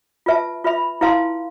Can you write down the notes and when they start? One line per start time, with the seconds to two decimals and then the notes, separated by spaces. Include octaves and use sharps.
0.26 F4 B4 E5 A5
0.64 F4 B4 E5 B5
1.01 E4 B4 F5 A5 C6